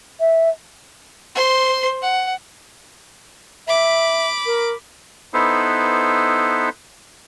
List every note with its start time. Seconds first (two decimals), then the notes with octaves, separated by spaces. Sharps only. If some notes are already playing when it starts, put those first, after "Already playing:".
0.20 E5
1.35 C5 C6
2.02 F#5
3.67 E5 B5 D6
4.46 A#4
5.34 B3 D#4 E4 A4 B4 C5